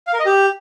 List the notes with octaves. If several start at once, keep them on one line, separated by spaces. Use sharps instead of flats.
F5
A#4
D#5
G4